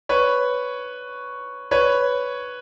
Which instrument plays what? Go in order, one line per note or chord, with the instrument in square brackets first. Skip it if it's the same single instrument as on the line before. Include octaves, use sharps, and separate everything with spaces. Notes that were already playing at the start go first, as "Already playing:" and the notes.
[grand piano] B4 C#5
B4 C#5